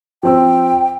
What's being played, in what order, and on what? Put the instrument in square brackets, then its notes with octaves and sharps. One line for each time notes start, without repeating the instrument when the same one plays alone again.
[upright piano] F3 C4 E6 [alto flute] G5